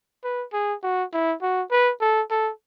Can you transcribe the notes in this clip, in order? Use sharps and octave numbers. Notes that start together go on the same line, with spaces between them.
B4
G#4
F#4
E4
F#4
B4
A4
A4